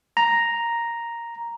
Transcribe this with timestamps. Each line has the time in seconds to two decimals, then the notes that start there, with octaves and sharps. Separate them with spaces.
0.17 A#5